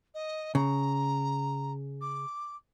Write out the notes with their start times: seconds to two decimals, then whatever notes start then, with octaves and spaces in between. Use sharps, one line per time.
0.14 D#5
0.55 C#3 A#5
2.01 D6